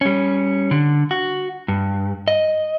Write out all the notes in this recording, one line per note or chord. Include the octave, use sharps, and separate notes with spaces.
G3 C#4
D3
F#4
G2
D#5